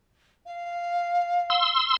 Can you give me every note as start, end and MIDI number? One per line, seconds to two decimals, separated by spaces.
0.45 1.66 77
1.50 1.97 84
1.50 1.97 88